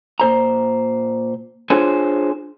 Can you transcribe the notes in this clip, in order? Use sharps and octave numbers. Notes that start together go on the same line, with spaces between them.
A#2 C5 A#5
D4 F4 G#4 C5 C#5 G#5